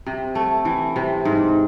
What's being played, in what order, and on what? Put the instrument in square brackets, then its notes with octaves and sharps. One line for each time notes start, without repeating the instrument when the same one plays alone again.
[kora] C3
A3
E3
C3
G#2